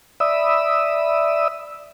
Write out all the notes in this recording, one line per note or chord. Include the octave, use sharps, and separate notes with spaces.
D5 E5 B5 D#6 E6